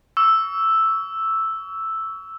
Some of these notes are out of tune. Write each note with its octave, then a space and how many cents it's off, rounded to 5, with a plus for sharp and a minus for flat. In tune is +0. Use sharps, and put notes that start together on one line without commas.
C#6 +35 E6 +0